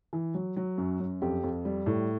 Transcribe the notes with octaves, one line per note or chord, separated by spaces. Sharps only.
E3
F#3
F#3
F#2
F#2
F2 G4
F2
G3
A2